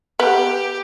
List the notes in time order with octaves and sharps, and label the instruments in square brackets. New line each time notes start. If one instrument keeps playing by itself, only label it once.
[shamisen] B3 [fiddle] G4